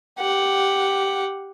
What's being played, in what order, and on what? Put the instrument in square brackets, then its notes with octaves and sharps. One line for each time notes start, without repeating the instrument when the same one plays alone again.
[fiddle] G4 F#5